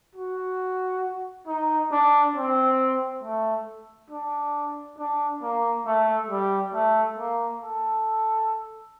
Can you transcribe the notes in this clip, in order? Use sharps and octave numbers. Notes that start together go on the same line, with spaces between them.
F#4
D#4
D4
C4
A3
D4
D4
A#3
A3
G3
A3
A#3
A4